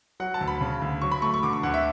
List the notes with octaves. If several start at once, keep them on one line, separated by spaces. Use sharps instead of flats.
F#3 F#5
A5
D2
B5
C#3
D2
F#3 C#6
B5
A3 C#6
C#6
D3 D6
C#6
D2 F#5
E5